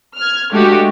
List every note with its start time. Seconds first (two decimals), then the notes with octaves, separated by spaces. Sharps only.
0.18 F6 G#6
0.52 G#3 A3 D4 F#4 G4